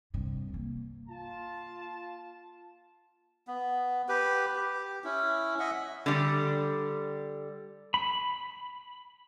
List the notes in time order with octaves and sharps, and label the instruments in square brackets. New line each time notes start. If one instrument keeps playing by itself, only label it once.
[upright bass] G2 C3
A#3
[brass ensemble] F4 A5
[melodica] B3
G4 B4
G4
C#4 E4
D#5 E5 F#5
[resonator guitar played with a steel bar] D3 G3
[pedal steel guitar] B5